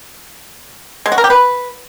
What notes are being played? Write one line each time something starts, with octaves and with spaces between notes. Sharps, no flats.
G#3
F#4
A#4
G4
B4